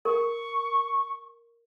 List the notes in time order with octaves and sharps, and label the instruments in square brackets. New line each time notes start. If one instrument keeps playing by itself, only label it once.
[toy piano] A#4 [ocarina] C#6